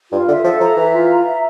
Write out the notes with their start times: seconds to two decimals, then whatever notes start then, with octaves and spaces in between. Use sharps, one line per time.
0.12 G2 F4
0.28 D3 E5
0.44 F3 A4
0.60 F3 A#5
0.76 E3 E5
0.93 F4
1.10 A#5
1.26 E5